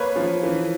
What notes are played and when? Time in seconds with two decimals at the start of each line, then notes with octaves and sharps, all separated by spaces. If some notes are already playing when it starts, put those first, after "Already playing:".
Already playing: A#3 B4 C#5
0.16 F3
0.43 E3